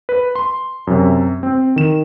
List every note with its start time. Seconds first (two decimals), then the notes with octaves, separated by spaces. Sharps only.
0.09 B4
0.35 C6
0.87 F#2 C3
1.43 C4
1.76 D#3 E7